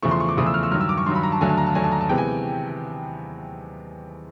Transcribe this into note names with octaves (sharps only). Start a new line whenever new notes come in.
E2 C#3 F3 A3 C#6
C6
C#6
D6
E2 C#3 F3 A3 D#6
E6
F6
E6
G2 D#3 F#3 F6
E6
D6
C#6
G2 D#3 F#3 C6
B5
A#5
A5
D#2 D3 F#3 A3 G#5
A5
A#5
A5
D#2 D3 F#3 A3 G#5
A5
A#5
A5
C3 E3 G#3 B3 G5
G#5